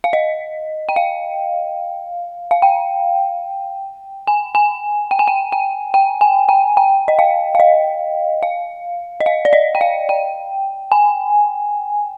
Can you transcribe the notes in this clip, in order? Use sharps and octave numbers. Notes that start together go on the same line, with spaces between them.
F5
D#5
G5
F5
F5
G5
G#5
G#5
G5
G#5
G5
G5
G5
G#5
G5
G5
D#5
F5
F5
D#5
F5
D#5
F5
D5
D#5
G5
F5
G5
G#5